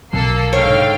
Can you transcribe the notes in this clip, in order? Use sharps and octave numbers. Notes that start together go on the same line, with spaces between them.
B1 C3 F#3 A#3 A4 C7
G#2 D3 C5 C#5 F5 G5